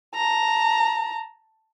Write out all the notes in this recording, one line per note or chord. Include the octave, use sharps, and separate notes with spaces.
A5 A#5